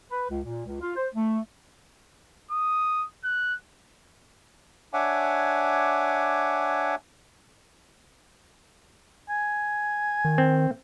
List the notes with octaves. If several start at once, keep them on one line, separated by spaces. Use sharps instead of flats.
B4
C#2
A#2
C#2
F4
C5
A3
D#6
F#6
D4 C#5 E5 F#5 G#5 D6
G#5
D#3
C4